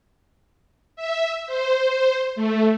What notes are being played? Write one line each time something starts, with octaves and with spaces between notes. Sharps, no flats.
E5
C5
A3